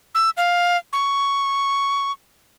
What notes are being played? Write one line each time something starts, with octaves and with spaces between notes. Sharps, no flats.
E6
F5
C#6